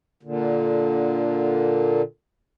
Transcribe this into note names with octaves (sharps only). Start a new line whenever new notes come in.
A#2 D3